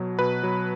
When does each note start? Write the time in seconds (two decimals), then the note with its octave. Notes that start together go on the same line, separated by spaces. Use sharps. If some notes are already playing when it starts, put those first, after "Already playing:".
Already playing: B2 F#3
0.19 B2 B4
0.43 F#3